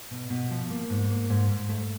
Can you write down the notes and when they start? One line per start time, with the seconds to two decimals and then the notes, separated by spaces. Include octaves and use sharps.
0.11 B2
0.30 B2
0.50 F3
0.70 A#3
0.90 G#2
1.10 A#3
1.30 G#2
1.49 G#2
1.69 A3